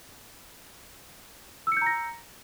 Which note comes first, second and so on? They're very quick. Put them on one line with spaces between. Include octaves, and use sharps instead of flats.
E6 C#7 G6 A#5 A#6